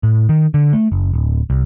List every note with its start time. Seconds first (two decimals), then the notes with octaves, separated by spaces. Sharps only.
0.03 A2
0.29 D#3
0.54 D3
0.73 A3
0.92 F#1
1.13 D1
1.50 C2